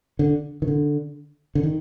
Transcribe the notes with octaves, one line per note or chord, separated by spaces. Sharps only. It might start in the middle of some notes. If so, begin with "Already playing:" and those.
D3
D#3
D3
D3
D#3